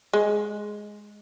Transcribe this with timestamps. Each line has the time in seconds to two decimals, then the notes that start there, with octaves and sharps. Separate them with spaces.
0.13 G#3